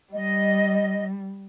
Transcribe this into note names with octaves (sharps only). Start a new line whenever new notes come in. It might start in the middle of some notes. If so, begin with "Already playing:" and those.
G3 D#5